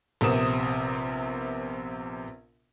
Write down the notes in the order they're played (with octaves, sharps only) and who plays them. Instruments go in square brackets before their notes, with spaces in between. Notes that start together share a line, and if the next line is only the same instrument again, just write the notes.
[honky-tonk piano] A#1 C3 B3 A#4 D#6 E7